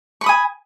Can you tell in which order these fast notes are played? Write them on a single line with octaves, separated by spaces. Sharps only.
C#6 B5 D#6 G#5